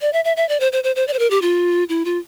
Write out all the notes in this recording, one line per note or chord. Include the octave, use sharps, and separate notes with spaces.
D5
E5
E5
E5
D5
C5
C5
C5
C5
D5
C5
A#4
G4
F4
E4
F4